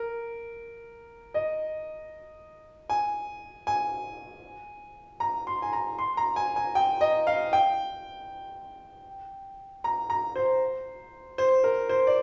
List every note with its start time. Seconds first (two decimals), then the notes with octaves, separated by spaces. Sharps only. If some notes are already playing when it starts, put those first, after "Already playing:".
Already playing: A#4
1.34 D#5
2.90 G#5
3.67 G#5
5.20 A#5
5.47 C6
5.62 G#5
5.73 A#5
5.98 C6
6.17 A#5
6.36 G#5
6.56 G#5
6.75 G5
7.01 D#5
7.27 F5
7.53 G5
9.84 A#5
10.10 A#5
10.36 C5
11.38 C5
11.64 A#4
11.89 C5
12.07 D5